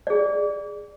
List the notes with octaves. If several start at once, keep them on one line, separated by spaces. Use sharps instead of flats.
G#4 D5